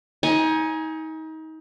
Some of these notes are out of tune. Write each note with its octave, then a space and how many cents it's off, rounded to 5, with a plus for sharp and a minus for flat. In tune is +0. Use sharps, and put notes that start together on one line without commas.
D#4 +30 G#5 +0